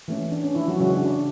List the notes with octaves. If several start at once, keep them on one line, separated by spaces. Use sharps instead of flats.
E3 A3 C#4
D4
C#4
E3 E4
F#3 F#4
C#3 F#3 G#3 C#4 F#4
D4